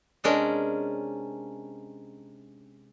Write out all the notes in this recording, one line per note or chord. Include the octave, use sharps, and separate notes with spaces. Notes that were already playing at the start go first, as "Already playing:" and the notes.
C3 G#3 C#4 D4 A#4